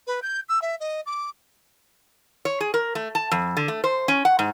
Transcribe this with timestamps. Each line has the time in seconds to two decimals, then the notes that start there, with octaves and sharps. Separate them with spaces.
0.07 B4
0.22 G6
0.49 E6
0.62 E5
0.80 D#5
1.06 D6
2.45 C#5
2.61 G#4
2.74 A#4
2.95 A3
3.15 A5
3.32 F2
3.57 D3
3.68 A3
3.84 C5
4.08 C#4
4.25 F#5
4.39 G#2